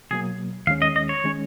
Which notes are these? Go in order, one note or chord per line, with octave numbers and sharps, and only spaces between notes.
B2 F#3 A#3 G#4
D#2 D#3 G#3 C#4 F5
D#5
D#5
C#5
D#3 G#3 C#4